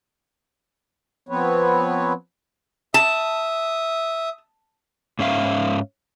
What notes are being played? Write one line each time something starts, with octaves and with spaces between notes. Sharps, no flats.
F3 B3 C4 B4 C#5
E5 A5 D#6
G#2 C#4 E5 F5